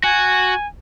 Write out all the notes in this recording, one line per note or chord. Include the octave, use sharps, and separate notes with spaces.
F#4 G#5